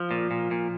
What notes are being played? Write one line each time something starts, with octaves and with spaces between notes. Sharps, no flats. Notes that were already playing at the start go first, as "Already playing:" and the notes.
Already playing: F3
A#2
A#2
A#2